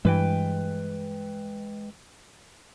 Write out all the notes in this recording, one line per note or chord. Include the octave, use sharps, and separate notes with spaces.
G2 E3 G#3 B4 G5